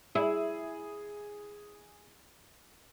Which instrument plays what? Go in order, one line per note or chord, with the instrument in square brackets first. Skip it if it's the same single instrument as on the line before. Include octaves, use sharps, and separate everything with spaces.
[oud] E4 [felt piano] G#4